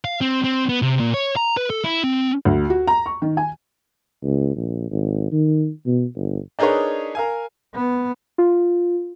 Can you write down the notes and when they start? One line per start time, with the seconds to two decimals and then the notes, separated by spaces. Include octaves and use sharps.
0.04 F5
0.21 C4
0.44 C4
0.69 B3
0.82 C3
1.00 A#2
1.14 C#5
1.36 A#5
1.57 B4
1.70 A4
1.84 E4
2.04 C4
2.45 D2
2.70 F#4
2.87 A#5
3.06 C#6
3.22 D#3
3.37 G#5
4.23 C#2
4.56 A#1
4.91 G#1
5.32 D#3
5.87 B2
6.16 G1
6.59 D4 D#4 G#4 A#4 B4 C#5
7.15 A#4 F5 G#5
7.75 B3
8.38 F4